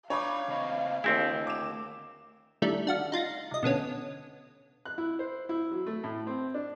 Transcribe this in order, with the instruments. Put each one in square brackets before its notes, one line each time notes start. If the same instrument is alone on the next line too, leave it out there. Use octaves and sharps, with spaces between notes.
[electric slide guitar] D4 A#5 [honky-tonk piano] C#5 B5 D6 [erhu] F5
[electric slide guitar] C#3 C4 D#5
[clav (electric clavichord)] D#2 C4 E4 [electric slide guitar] A3 D4 F#4 [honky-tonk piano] G#4
[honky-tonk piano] D6 E7
[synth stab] D#3 G3 A3 D4 E4
D4 F#4 F5
D#4 F4 A6 A#6
C2 D#5
B2 D3 B3 C#4
[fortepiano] F#6
E4
C5
E4
F#3
A3
A2
C4
D4